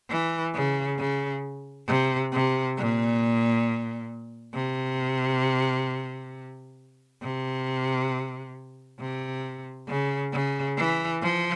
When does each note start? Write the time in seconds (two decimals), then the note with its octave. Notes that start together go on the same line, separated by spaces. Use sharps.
0.10 E3
0.55 C#3
0.99 C#3
1.88 C3
2.33 C3
2.77 A#2
4.54 C3
7.22 C3
9.00 C3
9.88 C#3
10.33 C#3
10.78 E3
11.22 F3